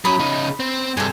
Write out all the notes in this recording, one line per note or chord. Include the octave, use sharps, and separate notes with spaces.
F#3 C#4 B5 D#6
C#3 D#4
C4
G2 C3 G#4 A4